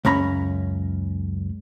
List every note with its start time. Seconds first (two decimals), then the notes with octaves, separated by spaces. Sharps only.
0.05 C#2 F#2 C#4 A#5 B5